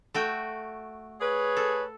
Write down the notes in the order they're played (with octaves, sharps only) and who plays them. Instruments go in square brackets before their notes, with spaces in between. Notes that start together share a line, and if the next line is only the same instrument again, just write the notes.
[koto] A3 F#4 G5
[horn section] G#4 B4 C#5
[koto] A4